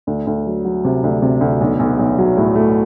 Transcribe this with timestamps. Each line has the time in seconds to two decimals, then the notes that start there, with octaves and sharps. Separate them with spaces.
0.07 D2
0.27 D2
0.46 F#3
0.65 F#3
0.85 C3
1.04 D2
1.22 C3
1.41 D2
1.61 B1
1.79 B1
1.99 B1
2.18 F#3
2.37 A2
2.55 A3